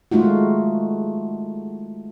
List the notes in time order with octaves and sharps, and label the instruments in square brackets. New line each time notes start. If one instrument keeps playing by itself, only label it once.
[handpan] G#3 A3 D#4 F4 F#4